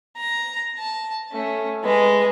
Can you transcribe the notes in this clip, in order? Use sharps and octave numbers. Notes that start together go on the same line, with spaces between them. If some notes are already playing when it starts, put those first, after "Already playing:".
A#5
A5
A3 C#4
G#3 B4